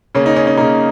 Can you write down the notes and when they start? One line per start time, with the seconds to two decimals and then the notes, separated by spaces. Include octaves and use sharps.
0.15 C#3 A#3 C#4
0.26 D#4
0.36 C#4
0.47 C#4
0.57 C#3 A#3 D#4